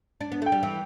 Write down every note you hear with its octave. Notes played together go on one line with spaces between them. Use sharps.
D4
B3
A3 G5
G3
E3